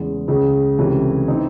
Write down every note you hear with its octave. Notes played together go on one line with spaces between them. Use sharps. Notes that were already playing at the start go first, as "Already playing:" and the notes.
Already playing: E2 C#3 G#3
C#2 C#3 G#3
C#2 C3 E3 A3 C#4
E3 C4 D#4